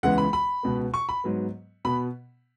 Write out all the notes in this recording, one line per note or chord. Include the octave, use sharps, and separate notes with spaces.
C#2 C#3 E3 G#3 B3 F#5
B5
B5
C#2 B2 B3
C#6
B5
G#2 F#3 B3
B2 B3 B5